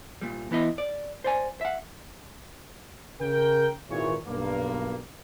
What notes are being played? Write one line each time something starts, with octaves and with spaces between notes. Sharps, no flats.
C2 A#2 G3
E3 B3 E4 D#5
D5
C5 D5 G#5
E5 F#5
C#3 A#4 G5
G#1 A#2 E3 C#5
B1 G2 A#3